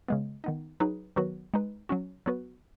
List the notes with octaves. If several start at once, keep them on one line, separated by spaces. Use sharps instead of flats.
C#3 G#3 B3
D#3 B3 D#4
F#3 D#4 G#4 B4
D#3 F#3 B3 F#4 B4
G#3 D#4 B4
F#3 C#4 F#4
F#3 B3 F#4 B4